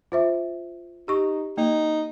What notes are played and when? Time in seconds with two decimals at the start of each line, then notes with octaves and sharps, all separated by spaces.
0.12 F4 C5 E5
1.08 D#4 G4 C#6
1.57 A#3 D#4